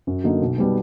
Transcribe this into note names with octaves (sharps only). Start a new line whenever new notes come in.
F#2
D3 F#3 A#3 D#4
B1
B2 G3 B3